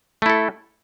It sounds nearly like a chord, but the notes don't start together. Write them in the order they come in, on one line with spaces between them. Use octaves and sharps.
A3 E4 A4